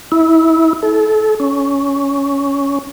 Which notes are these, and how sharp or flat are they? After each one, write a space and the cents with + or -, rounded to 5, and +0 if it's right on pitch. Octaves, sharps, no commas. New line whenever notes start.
E4 -25
A4 -30
C#4 +10